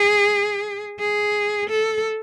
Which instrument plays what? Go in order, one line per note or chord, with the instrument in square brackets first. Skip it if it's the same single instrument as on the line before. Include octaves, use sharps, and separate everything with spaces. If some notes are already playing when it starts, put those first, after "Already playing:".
Already playing: [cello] G#4
G#4
A4